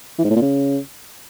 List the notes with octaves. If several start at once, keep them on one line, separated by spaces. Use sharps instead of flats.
E3
G#2
A2
A#2
C#3